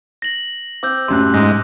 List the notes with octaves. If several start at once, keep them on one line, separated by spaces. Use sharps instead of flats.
A#6 F#7
C4 D6 E6 G6
C2 F#2 A2 C6 F#6
G#2 A#6